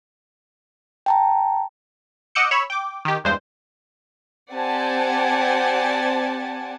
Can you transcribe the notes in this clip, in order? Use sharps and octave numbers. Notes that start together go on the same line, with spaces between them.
G5 A5 A#5
D#5 F#5 D6 E6 G6 C#7
C#5 B5 E6
G5 D6
D#3 G4
E2 G2 G#3 C5
C4 G4 D5 F#5 G#5 A5